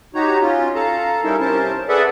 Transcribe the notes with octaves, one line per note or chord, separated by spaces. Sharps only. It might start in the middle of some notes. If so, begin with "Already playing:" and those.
D#4 F#4 G4 C#5 A#5
C#4 F4
A4 F5 A5 A#5
G3 C#4 D#4 E4 A4 A#4
C3 C#4 A#4 C5 A5
G#4 A4 B4 D5 E5 F#5